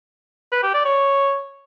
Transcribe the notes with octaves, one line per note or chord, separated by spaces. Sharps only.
B4
G4
D5
C#5